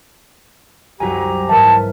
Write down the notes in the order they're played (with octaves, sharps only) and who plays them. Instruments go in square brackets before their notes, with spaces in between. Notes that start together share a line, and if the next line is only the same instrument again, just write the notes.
[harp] C2 F#2 F#3 [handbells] F#4 G#5 [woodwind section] G4 A#5
[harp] G#2 E3 [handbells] A#4 E5 [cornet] A5